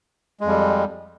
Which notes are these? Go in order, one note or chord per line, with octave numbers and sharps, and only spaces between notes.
F2 G3 G#3